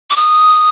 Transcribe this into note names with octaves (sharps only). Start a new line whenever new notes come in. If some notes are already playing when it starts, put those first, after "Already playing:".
D6
D#6